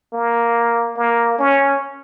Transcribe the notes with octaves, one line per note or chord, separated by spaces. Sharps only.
A#3
A#3
C#4